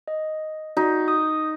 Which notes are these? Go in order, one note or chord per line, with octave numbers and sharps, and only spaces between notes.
D#5
D#4 F#4
D#6